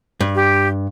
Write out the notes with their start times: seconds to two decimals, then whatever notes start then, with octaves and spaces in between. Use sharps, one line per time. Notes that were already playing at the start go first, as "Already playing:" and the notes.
0.21 G2
0.35 G4